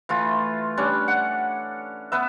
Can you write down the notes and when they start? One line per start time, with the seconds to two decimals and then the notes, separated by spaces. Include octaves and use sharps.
0.09 E3 A3 F4
0.77 G3 C#4 D4
1.08 F#5
2.12 B3 B4 E5